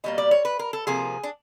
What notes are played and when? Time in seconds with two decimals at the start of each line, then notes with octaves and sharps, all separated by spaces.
0.04 B2 G3 A#3 D#5
0.18 D5
0.31 C#5
0.45 B4
0.59 A#4
0.73 A4
0.87 C3 F3 A#3 G#4
1.23 D4